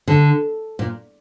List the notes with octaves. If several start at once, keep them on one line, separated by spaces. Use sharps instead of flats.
D3
A#2